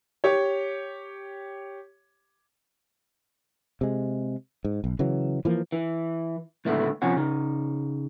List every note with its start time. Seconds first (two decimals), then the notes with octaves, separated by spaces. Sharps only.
0.24 G4 C#5
3.81 C3 G#3
4.65 G#2
4.84 B1
4.99 C#3 E3 F#3
5.45 E3 F3 A#3
5.72 E3
6.65 C#2 A2 D3 A3 B3
7.02 C3 F3 C#4 F#5
7.16 C#3 D#4